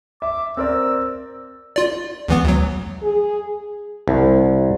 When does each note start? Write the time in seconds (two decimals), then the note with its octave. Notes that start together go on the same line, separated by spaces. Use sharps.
0.22 E5 D6
0.57 C4 A#4 D5 E6
1.76 F4 D5
2.28 E2 E3 B3
2.45 D2 F#3
3.03 G#4
4.08 C2